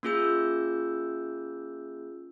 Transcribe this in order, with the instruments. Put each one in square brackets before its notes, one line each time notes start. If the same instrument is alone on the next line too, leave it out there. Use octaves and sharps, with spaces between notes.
[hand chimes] A#3 C#4 F4 G#4 E6 G6